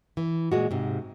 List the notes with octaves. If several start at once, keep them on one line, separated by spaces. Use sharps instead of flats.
E3
A#2 G#3 F#4
G#2 C3